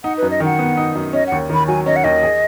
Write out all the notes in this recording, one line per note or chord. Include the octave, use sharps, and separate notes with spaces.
D#4 F#5
B4
F#2
D#5
D#3 F#5
B3
D#4
F#2
C#4 D#5
D#2 F#5
D#3 B5
F#3 G#5
C#4 D#5
F#5
D#2 D#5
G#4